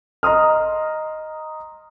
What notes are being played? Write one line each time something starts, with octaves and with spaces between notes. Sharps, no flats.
D#5 A#5 C6 D#6 F6